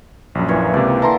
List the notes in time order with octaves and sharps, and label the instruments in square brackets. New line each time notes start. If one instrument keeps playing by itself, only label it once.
[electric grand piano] A#1 F#2
[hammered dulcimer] A#2 E3 C#5
[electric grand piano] C#2 C3 [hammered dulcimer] D5
[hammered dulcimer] D3 E3 [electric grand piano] A5 A#5 C6